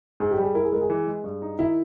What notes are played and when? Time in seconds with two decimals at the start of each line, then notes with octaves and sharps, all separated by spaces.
0.20 G#2 G#4
0.31 G4
0.38 G3 G#4
0.54 E4 A#4
0.63 G#4
0.72 G#3 A#4
0.81 G#4
0.90 E3
1.07 G#3
1.24 G2
1.42 D#4
1.59 D#3 E4